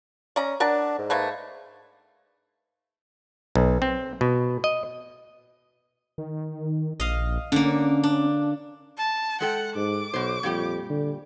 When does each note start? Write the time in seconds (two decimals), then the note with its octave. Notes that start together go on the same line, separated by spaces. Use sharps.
0.36 C#4 D5 A#5
0.60 D4 A#4 F#5 A5
0.98 G#2
1.10 A3 A#3 B4
3.56 B1
3.82 C4
4.21 B2
4.64 D#5
6.18 D#3
7.00 A#1 D#5 F5
7.52 D3 A#3 C#4
8.04 D4
8.98 A5
9.41 G#3 A4 F#5 G5
9.76 G#2 D6
10.14 B1 B2 C5
10.43 F2 A#2 G3 G4
10.90 D3